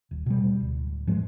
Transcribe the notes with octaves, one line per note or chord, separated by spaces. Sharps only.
D#1
B2 G3
D1
G#2 F3 G#3